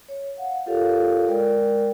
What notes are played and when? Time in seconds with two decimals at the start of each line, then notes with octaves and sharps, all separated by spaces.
0.08 C#5
0.37 F5 F#5
0.66 F4 G4 A4 A#4 C#5 F5
1.29 G#3 A#4 D5 G5